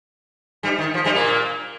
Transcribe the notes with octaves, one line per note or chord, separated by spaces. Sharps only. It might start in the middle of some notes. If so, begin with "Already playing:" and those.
G2 G3
D#3
F3
G2 G3
A#2 A#3